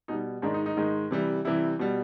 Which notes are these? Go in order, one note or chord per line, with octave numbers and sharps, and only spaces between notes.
B2 G3 D#4
G#2 D#3 G#3 D4
D#4
D#4
G#2 D#3 G#3
C3 E3 G3
C3 E3 G3 E4
B2 G3